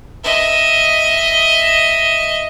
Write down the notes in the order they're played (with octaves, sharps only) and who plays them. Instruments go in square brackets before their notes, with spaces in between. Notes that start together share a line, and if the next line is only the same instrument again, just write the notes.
[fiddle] D#5 E5